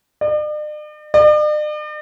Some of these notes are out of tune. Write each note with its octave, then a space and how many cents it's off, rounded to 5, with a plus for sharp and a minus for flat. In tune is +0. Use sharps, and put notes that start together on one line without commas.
D5 +45
D5 +45